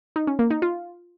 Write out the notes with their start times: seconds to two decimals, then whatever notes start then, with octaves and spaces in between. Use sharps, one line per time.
0.16 D#4
0.27 C#4
0.39 A#3
0.50 D#4
0.62 F4